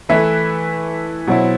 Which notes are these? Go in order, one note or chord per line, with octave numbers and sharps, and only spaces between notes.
E3 A3 E4 B4 E5
B2 F#3 C4 E4